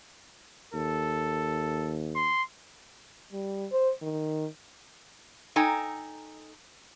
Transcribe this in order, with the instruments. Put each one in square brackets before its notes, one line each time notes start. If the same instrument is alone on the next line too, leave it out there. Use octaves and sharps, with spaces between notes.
[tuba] D#2 [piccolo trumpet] A4
[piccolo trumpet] C6
[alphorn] G3
C5
D#3
[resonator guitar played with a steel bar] D#4 A4 G5 G#5 A#5